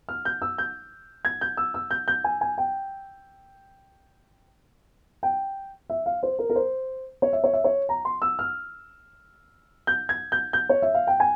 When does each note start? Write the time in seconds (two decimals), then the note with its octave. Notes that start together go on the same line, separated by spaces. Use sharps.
0.09 F6
0.25 G6
0.42 E6
0.58 G6
1.25 G#6
1.41 G6
1.57 E6
1.74 E6
1.91 G6
2.08 G6
2.24 G#5
2.41 G#5
2.58 G5
5.23 G5
5.90 E5
6.06 F5
6.23 C5
6.39 A#4
6.50 A#4
6.56 C5
7.22 C#5
7.33 E5
7.44 C#5
7.53 E5
7.64 C#5
7.89 A#5
8.05 C6
8.22 E6
8.39 F6
9.87 G6
10.09 G#6
10.32 G6
10.53 G6
10.69 C#5
10.82 E5
10.94 F5
11.07 G5
11.20 G#5